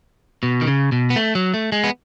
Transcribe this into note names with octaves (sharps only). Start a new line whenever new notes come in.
B2
D#3
C#3
B2
B3
A3
F#3
A3
G#3
B3